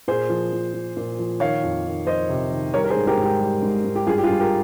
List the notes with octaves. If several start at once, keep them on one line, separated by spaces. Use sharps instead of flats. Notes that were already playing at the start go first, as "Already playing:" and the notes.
A#2 G#4 C5
F3
F3
F3
A#2
F3
D#3 C#5 F5
F2
D#3
F2 C5 D#5
C3
D#3
G3 A#4 C#5
A#4
G#4 C5
G#2
G4 A#4
G#2
G4
G3
G#2
G#2
G4
G2 F4 G#4
G4
F4 G#4
G2
G4 A#4